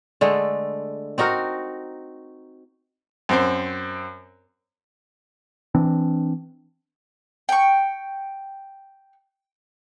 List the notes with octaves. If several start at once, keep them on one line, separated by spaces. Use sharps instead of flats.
D3 G#3 A3
C4 D#4 F#4 A#4
F#2 C4 C5
E3 C4 D4
G5 C#6